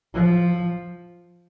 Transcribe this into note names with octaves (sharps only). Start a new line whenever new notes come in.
F3